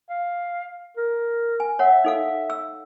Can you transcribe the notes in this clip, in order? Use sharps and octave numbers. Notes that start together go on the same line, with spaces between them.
F5
A#4
G#5
C#5 E5 F#5
D#4 A4 F5
E6